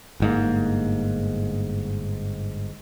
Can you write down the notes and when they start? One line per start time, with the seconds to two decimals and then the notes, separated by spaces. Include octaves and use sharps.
0.20 G1 G#2 A#3